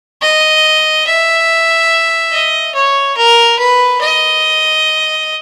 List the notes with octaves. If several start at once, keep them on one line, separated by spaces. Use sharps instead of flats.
D#5
E5
D#5
C#5
A#4
B4
D#5